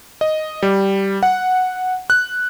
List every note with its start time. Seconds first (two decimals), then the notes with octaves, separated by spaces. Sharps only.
0.21 D#5
0.63 G3
1.23 F#5
2.10 F#6